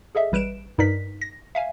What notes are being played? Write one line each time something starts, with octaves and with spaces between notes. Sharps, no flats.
G#4 A4 D#5 E5
A1 G3 B4 D7 E7
G2 D#4 A#4 B4 D5 B6
A#6
E5 F5 G#5